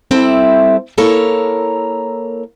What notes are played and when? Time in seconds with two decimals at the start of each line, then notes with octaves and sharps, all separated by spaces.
0.11 G3 C4 E4 A4 E5
0.98 A#3 E4 A4 A#4 C#5